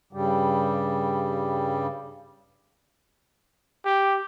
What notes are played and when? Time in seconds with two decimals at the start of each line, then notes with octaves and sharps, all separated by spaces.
0.13 G2 C#3 G3
3.85 G4